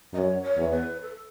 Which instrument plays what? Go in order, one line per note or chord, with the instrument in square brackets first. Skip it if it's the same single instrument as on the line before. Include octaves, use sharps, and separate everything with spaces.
[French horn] F#2 [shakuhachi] D#5
[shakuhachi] C#5
C#5
[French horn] E2
[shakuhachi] B4
A4